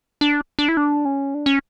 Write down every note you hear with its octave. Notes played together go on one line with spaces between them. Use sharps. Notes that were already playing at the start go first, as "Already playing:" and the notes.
D4
D4
E4
D4
C#4
D4
C#4